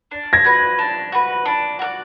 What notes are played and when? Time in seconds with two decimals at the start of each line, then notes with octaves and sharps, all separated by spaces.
0.11 D4
0.33 G#6 A#6
0.44 F#4 B4
0.79 D4
1.12 F#4 B4
1.46 D4
1.79 F#4 A#4 D5